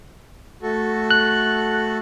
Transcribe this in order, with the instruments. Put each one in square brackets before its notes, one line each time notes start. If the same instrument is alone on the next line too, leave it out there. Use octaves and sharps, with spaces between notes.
[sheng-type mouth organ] A3 F#4 A4
[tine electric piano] F#6